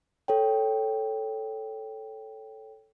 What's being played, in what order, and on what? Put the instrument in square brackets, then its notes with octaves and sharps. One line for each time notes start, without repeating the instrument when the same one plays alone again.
[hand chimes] A4 C#5 G5